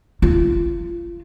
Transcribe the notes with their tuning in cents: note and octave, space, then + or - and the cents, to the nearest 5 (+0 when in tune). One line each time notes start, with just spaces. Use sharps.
F4 -30